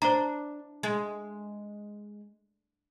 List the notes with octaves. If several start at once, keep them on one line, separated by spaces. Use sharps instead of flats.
D4 C5 A#5
G#3